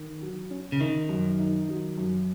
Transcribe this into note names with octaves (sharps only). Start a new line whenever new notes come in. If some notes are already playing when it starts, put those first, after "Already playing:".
Already playing: D#3
F#3
C#4
C#3
D#3 D#4
F#2
D#4
F#3
F#2